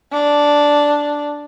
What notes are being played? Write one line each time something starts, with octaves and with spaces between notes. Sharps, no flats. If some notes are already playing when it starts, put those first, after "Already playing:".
D4